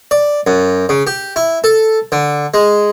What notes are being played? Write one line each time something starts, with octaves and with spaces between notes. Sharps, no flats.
D5
F#2
C#3
G4
E4
A4
D3
G#3